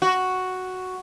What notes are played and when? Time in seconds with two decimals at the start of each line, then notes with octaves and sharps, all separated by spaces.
0.02 F#4